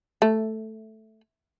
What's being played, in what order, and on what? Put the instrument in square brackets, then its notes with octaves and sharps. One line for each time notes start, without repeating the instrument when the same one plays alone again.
[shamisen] A3